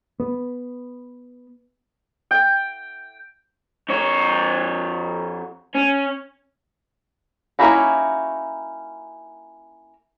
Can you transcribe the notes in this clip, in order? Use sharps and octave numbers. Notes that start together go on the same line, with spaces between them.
B3
G5
F2 C#5
C#4
A#3 C#4 D#4 E4 F#4